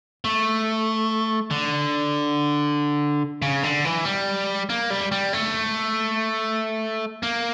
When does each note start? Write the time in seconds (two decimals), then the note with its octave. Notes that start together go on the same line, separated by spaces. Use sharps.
0.24 A3
1.51 D3
3.42 C#3
3.63 D3
3.85 E3
4.05 G3
4.69 A#3
4.90 G3
5.12 G3
5.33 A3
7.23 A#3